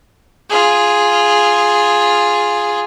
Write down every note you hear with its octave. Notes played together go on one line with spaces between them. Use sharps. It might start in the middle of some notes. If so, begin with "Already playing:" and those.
F4 G#4